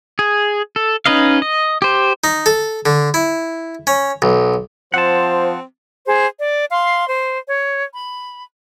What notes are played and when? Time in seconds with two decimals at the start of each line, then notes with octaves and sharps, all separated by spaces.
0.19 G#4
0.76 A4
1.06 C#4 D#4 B4 D#5 F5
1.42 D#5
1.82 G4 C5
2.24 D#4
2.46 A4
2.86 D3
3.14 E4
3.87 C#4
4.22 B1
4.94 F3 C4 C5 F#5 A5
6.06 G#4 C5
6.39 D5
6.71 F5 C6
7.08 C5
7.47 C#5
7.95 B5